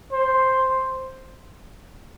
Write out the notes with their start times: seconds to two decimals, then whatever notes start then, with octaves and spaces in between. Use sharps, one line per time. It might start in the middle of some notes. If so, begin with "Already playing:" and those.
0.13 C5